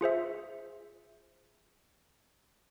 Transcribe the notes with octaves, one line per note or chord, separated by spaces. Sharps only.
F4 G#4 C5 E5